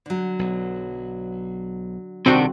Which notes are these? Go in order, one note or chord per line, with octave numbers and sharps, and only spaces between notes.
D3 F#3
B1
D#1 C2 C3 D#3 C4 D4 F#4